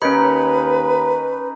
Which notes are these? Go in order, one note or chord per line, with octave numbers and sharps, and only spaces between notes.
D#2 C#4 D#4 A#4 B4 C#5 B5